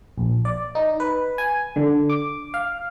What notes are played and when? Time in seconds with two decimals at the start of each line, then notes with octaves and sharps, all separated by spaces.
0.18 A#1
0.45 D5
0.75 D#4
1.00 B4
1.38 G#5
1.76 D3
2.09 D6
2.54 F5